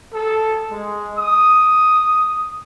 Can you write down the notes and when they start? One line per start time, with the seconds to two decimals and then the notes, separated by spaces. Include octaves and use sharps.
0.14 A4
0.71 G#3
1.17 D#6